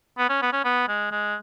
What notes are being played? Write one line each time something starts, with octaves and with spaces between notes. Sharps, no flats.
B3
C#4
B3
C#4
B3
G#3
G#3